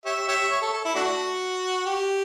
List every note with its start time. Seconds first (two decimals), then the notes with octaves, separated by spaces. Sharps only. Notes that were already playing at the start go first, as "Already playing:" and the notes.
0.06 G4 C#5 E5
0.28 G4 C#5 E5
0.51 C#5
0.62 A4
0.73 A4
0.85 E4
0.95 A3 D4 F#4
1.86 G4